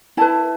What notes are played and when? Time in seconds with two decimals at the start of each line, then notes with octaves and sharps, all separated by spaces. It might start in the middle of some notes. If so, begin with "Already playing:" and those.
0.17 E4 B4 A5